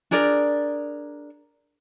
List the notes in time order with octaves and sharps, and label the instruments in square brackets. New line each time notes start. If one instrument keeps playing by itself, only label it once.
[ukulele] D4 G#4 A#4 D5